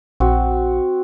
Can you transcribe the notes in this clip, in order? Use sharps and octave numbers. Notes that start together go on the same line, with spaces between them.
A#1 C4 F#4